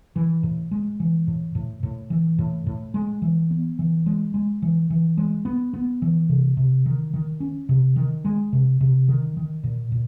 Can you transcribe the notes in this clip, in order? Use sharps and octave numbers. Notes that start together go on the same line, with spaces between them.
E3
A2
G#3
E3
A2
A2
A2
E3
A2
A2
G#3
E3
B3
E3
G#3
G#3
E3
E3
G#3
B3
B3
E3
C3
C3
D#3
D#3
C#4
C3
D#3
G#3
C3
C3
D#3
D#3
A#2
A#2